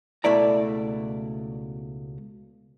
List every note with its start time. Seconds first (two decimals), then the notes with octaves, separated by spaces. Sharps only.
0.24 C#2 B2 A3 E4 D5 A#5